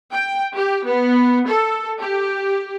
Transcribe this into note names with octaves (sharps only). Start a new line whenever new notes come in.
G5
G4
B3
A4
G4